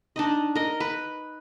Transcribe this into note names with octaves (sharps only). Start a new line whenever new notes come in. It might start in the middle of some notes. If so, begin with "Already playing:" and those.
D4 D#4 D#5
A#4 D#5
B4